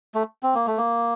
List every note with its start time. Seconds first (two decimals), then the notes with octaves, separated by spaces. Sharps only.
0.15 A3
0.43 C4
0.55 A#3
0.67 A3
0.78 A#3